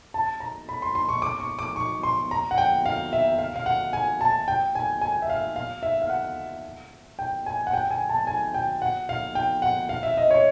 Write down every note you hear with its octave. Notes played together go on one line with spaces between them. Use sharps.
A5
A#5
B5
C6
C6
C#6
D6
C#6
D6
C#6
C6
A#5
F#5
G5
F5
E5
F5
F5
F#5
G#5
A5
G5
G#5
G#5
E5
F5
F5
E5
F5
F#5
G5
G#5
F#5
G5
G#5
A5
G#5
G5
F#5
F5
G5
F#5
F5
E5
D#5
C#5